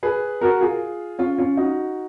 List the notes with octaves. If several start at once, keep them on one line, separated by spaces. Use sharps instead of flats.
G#4 B4
F#4 A#4
F4 G#4
C#4 F4
C#4 F4
D#4 F#4